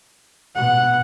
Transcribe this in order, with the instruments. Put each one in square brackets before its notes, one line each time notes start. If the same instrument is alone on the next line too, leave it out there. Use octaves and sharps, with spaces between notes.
[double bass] B2 [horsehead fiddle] F#5